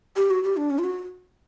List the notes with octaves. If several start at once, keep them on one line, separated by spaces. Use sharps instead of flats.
G4
F#4
G4
D4
C#4
F4
F#4